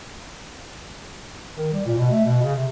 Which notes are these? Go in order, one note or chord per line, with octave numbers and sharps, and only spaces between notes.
D#3
G3
A#2
B2
A3
B2
C#3
C3